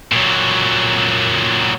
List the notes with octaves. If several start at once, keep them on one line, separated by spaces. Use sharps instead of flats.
A#2 F#3